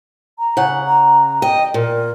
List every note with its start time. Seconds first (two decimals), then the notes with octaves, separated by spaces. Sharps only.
0.39 A#5
0.57 C#3 F#5
0.87 A#5
1.42 D#5 G5
1.74 A#2 A#4